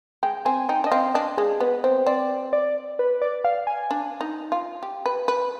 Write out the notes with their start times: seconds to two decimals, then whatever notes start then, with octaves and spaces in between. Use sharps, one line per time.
0.23 G#3 G5
0.45 C4 G#5
0.69 D#4 G5
0.84 D4 D#5
0.91 C4 F5
1.14 D4 D#5
1.38 G#3 G#4
1.60 B3 B4
1.84 C4 C5
2.06 C4 D5
2.53 D5
2.99 B4
3.22 D5
3.44 F5
3.67 G#5
3.91 D4
4.21 D#4
4.52 F4
4.83 G4
5.06 B4
5.28 B4